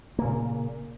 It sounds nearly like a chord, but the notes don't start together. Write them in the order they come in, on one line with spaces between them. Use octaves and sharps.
A#3 C#3 A#2